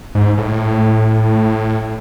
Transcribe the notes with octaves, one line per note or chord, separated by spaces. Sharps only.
G#2
A2